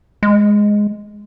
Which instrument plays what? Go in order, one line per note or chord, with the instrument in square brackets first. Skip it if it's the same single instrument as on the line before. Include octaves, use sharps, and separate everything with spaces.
[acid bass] G#3